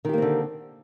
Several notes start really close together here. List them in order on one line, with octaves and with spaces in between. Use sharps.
D#3 G4 A#3 C4 D3